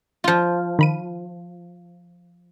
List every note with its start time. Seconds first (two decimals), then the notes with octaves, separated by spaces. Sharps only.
0.24 F3 F4
0.79 D#3 B5 D#7